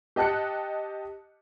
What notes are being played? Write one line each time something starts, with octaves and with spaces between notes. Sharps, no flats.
G4 D#5 A5 F#6 C#7